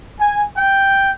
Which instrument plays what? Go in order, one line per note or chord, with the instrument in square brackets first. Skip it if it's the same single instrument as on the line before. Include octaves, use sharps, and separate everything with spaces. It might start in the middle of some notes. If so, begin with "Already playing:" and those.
[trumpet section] G#5
G5